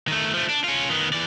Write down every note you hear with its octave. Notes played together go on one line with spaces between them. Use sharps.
D#3 A3
F3 A3
D4
C#4 F4
D#3 B3
E3 D5